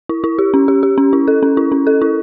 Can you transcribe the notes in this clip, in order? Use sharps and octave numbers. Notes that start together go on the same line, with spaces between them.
E4
E4
G4
C#4
G4
G4
C#4
E4
A4
C#4
E4
C#4
A4
E4